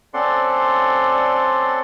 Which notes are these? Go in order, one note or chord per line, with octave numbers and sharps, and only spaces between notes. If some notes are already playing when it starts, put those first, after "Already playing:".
C4 C#4 A4 D5 F#5 C6